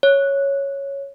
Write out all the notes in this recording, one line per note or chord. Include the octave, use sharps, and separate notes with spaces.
C#5